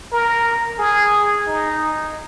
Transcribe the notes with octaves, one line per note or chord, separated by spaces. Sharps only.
A#4
G#4
D#4